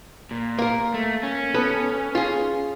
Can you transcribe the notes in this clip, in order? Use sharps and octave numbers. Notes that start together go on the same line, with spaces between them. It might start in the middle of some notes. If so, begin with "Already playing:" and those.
A#2
A#3 A#4
A3
C#4
B3 A4 B4
F4 G#4